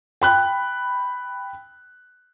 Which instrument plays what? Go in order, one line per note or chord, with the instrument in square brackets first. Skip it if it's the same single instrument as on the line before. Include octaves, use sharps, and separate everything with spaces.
[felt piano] G5 B5 F#6